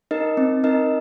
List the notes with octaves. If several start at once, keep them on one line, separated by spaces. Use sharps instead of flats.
D#4 A#4 D#5
C4
D#4 A#4 D#5